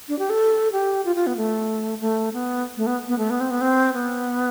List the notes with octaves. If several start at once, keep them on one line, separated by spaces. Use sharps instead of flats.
D4
G4
A4
G4
F4
F4
B3
A3
A3
B3
A3
B3
B3
A3
B3
C4
B3
C4
B3